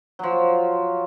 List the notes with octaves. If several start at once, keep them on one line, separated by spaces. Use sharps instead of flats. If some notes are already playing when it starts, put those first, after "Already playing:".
F3 F#3